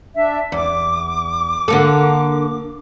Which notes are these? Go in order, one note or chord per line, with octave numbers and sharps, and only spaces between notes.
D4 E5
E2 D6
D3 A#3 A4